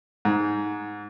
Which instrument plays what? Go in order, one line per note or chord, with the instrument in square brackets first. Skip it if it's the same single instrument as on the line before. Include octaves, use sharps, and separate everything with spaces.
[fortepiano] G#2